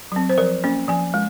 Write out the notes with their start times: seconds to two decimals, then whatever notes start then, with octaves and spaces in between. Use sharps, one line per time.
0.12 F#3 C4
0.29 C5
0.38 F3 A#4
0.64 A#3 C#4
0.88 F3 G#5
1.14 G#3